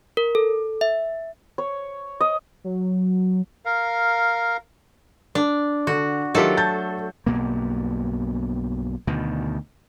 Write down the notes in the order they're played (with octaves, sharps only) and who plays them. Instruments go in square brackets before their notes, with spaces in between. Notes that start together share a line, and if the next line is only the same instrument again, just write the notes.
[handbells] A#4
A4
E5
[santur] C#5
D#5
[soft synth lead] F#3
[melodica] A#4 F5
[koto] D4
[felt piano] D3 [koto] F#4
[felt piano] D#3 F4 G4 [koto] F#3 A3 A4
[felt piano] A5 G6 A6
[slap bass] B1 G2 B2 A#3
D2 B2 D#3